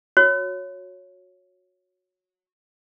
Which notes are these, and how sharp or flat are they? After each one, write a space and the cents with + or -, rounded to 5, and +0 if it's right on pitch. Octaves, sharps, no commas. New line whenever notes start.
F#4 -20 C#5 +0